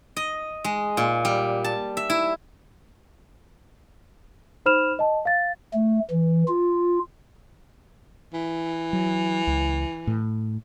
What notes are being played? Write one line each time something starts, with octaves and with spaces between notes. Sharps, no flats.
D#5
G#3
A#2
G3
A5
E5
E4
D#4 C5 B5 F6 E7 F7
D#5 A5
F5 A6
A3
E3
F4
E3
F#3
C#2
A2